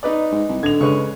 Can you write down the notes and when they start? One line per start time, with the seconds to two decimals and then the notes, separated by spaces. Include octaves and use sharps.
0.03 D#4 B4 D5
0.32 G#2
0.49 C2
0.63 D3 G#6 F7
0.81 C#3 G#3 B4 C#6